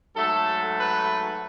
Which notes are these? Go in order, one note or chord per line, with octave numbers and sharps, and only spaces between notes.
G#2 F#3 A3 A4
B4